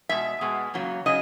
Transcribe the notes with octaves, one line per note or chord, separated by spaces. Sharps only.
B2 G#3 E5
B2 G#3 B3
C#3 F#3 A#3
C#3 F#3 D#5